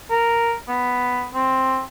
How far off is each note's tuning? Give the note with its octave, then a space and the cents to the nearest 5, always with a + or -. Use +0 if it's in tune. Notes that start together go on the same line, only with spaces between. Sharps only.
A#4 -5
B3 +5
C4 +5